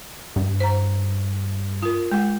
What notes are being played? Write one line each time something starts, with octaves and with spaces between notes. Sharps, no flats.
G2
C5 A#5
F4 A#4
G#3 F#5